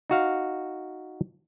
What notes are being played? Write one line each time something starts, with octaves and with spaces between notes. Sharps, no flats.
D#4 F#4 F5